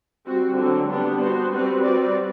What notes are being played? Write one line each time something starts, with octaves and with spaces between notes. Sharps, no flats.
G3 C4 F#4
D3 F#3 C4
G3 B3 D4 G4
B3 F#4 C5
G3 C4 F#4 B4
G3 C4 F#4 B4 D5